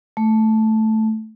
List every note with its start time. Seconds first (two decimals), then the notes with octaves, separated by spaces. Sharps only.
0.17 A3